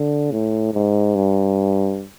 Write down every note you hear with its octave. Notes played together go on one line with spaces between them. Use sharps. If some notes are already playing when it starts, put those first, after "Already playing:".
Already playing: D3
A2
G#2
G2